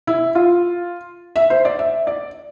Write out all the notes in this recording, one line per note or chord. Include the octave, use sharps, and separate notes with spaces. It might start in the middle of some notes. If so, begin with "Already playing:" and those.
E4
F4
E5
C5
D5
E5
D5